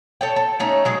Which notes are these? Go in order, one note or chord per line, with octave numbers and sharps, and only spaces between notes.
A4 C#5 G5
A4
A3 C#4 D#4
F#3 G#3 G#4